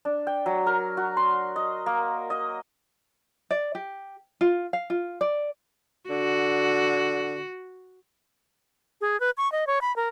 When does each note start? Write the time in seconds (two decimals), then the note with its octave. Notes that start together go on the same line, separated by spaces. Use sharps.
0.05 D4
0.27 G5
0.46 F#3
0.66 A#4
0.97 F#4
1.17 C6
1.56 D#5
1.86 A#3
2.30 D#5
3.50 D5
3.75 G4
4.41 F4
4.73 F5
4.90 F4
5.21 D5
6.10 D3 F#4
9.01 G#4
9.20 B4
9.37 C#6
9.52 D#5
9.67 C#5
9.81 B5
9.96 A#4